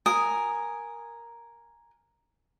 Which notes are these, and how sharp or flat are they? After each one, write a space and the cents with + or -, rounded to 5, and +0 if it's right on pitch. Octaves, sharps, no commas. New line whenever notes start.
A#4 +5 G#5 +0 D#6 +0